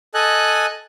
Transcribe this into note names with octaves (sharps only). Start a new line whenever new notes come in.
A4 D#5 G#5 F#6